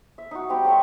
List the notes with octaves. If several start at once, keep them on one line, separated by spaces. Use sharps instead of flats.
E5
D#4 F#4
G3 C4 G4 A#5
A3 C#5 E5